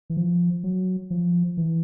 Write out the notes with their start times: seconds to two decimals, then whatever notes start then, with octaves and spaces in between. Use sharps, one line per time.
0.10 E3
0.17 F3
0.64 F#3
1.10 F3
1.57 E3